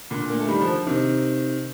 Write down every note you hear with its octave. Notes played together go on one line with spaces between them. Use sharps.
A#2 D3
A#3
A3
D#3 G3
D3 F3
C3 D#3